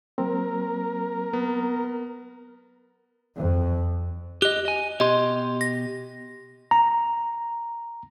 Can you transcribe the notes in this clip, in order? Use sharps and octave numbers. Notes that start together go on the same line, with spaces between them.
F#3 A#3 C4 A#4
B3
F2
G4 D#5 F#6
D#5 G#5
B2 G4 D#5 C6
A#6
A#5